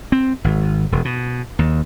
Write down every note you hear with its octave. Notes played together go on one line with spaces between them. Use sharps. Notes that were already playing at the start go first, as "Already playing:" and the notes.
C4
G#1
E1
B2
D#2